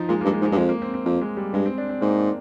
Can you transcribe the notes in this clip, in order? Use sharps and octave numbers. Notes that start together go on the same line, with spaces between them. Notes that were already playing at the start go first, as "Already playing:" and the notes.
Already playing: F3 D#4
A#2 G#3
A#3
G2
G#3
G#2
G#3
G2
F2 G#3
A#3
C4
C4
F2 A#3
G#3
G3
G2 G#3
C4
D4
C4
G#2 A#3